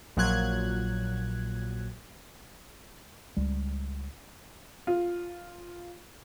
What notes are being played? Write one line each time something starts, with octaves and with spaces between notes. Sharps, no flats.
A#1 A#2 F#3 F#6 G#6
C#2 G3
F4